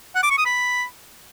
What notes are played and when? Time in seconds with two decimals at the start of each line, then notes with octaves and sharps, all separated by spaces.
0.15 F#5
0.23 D6
0.30 C#6
0.38 D#6
0.46 B5